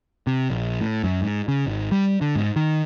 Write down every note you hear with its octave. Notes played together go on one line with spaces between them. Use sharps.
C3
A#1
A2
F#2
G#2
C#3
G#1
G3
D3
G#2
D#3